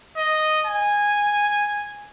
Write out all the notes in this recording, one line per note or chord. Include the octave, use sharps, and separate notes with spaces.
D#5
G#5